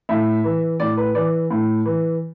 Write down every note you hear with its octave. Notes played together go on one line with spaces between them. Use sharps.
A2 E5
E3
A2 D5
B4
E3 D5
A2
E3